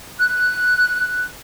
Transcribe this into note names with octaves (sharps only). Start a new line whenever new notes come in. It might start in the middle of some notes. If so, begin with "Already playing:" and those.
F#6